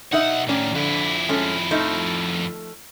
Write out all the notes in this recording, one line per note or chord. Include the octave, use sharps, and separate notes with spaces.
B1 D#4 D#5 E5 F#5
A2 D#3 C#4 D5
F2 D3 E4
G#3 C#4 A4
F3 A3 D#4